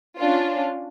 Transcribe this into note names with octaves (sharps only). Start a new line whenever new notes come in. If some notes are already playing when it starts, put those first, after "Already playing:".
C#4 D4 F4